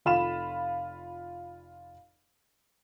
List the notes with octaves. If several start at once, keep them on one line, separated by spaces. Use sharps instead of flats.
F1 F4 B5 E7